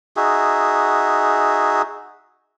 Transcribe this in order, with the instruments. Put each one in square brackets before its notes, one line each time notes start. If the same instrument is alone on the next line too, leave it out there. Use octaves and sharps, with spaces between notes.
[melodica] D#4 F#4 G#4 E5